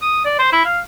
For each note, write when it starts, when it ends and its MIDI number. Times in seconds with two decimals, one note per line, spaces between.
0.02 0.20 87
0.25 0.38 74
0.39 0.50 72
0.52 0.63 64
0.65 0.79 77